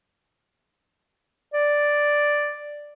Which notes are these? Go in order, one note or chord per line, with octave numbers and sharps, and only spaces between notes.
D5